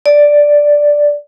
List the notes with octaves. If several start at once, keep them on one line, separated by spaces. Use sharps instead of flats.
D5